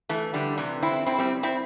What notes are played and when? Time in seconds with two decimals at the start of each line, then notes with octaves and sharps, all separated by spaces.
0.09 E3 A3
0.34 D3 G3
0.58 C3 E3
0.83 C4 E4
1.07 C4 E4
1.18 G3 C4
1.43 C4 E4